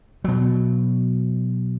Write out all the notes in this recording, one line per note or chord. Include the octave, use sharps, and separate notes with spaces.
B2 F#3